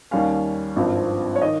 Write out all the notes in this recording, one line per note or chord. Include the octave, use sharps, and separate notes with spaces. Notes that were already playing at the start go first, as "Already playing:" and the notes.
D#2 D#3 G3 C#4 F5
G#1 G2 F3 C4
C#5
D#3 D#5